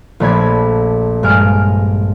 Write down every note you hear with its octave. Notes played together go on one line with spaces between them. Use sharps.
A#1 A3 D5 B5 G#6 B6
G2 G#3 G#5 F6 D7